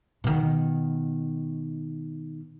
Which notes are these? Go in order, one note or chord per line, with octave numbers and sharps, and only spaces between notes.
B2 D#3